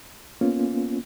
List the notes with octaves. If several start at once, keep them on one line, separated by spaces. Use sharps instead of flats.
A#3 B3 C#4 F4